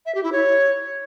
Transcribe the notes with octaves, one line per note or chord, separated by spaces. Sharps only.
E5
G4
E4
C#5